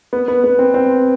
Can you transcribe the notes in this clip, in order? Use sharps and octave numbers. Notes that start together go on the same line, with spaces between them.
B3
B3
B3
C4
C4